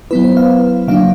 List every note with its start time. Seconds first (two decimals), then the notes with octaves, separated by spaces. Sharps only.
0.11 F#3 B3 E4 B4
0.24 C5
0.37 F5
0.88 C#3 F#3 A#3 D4 F5